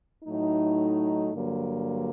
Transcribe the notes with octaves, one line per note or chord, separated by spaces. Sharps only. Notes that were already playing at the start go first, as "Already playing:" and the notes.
A2 F#3 A3 D#4
G2 D3 F#3 A#3